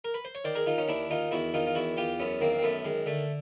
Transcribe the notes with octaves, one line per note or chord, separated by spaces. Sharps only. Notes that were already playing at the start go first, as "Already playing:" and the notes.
A#4
B4
C5
C#5
D#3 C5 D5
G#4 A#4
D#3 D#4 F4
C#4 D#4
D#2 D4 E4
D#3 D#4 F4
E2 E4 F#4
D#3 D#4 F4
F4
E2 E4 F#4
E2 F4 G4
F#2 B3 C#4
D#3 A#3 C4
C4
F#2 A3 B3
D#3 G#3
D3 A3